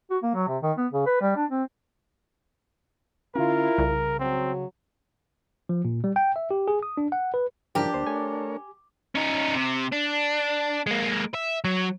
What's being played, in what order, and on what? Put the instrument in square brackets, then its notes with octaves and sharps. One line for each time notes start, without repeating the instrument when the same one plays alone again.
[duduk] F#4
A#3
F#3
C3
D#3
B3
C#3
B4
G3
D4
C4
[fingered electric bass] D3 C#4 [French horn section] E4 F4 [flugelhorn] A#4
[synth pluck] C2 [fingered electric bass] C#3
[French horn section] F#3 [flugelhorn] C4
[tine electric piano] F3
A#2
G3
G5
E5
G4
G#4
D#6
D4
F#5
B4
[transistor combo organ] G2 C#3 E3 [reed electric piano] F3 A#4 [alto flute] D4 [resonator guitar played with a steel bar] G4
[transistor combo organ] D2 A#3 [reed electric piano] C5
[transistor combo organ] A3 A#4 C#5 [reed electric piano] G#5
[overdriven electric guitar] C#4 D#4
C3
D4
G#3 A#3
E5
F#3